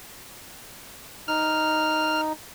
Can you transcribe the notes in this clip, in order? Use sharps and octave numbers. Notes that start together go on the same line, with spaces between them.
D#4 F6